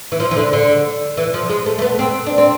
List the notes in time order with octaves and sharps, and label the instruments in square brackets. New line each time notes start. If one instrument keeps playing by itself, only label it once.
[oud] E3
F3
E3
D3
D3
E3
F3
G#3
A3
A3
B3
C4
D4
C4